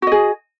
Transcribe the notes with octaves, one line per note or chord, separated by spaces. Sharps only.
F#4 G#4 D#5